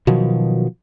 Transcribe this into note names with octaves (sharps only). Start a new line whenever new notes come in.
B2 D#3 F3 F#3